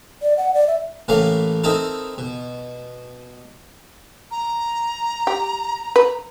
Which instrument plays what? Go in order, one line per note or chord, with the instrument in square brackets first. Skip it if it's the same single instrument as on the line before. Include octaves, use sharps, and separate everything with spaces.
[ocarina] D5
F#5
D5
E5
[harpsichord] A1 A2 E3 A3 A#3 F5
C4 D#4 E4 A4 A#4 A5
B2
[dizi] A#5
[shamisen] G4
B4